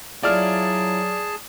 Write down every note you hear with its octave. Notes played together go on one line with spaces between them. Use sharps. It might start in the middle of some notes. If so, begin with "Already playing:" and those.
F#3 E4 F4 G#4 D5 A5 F6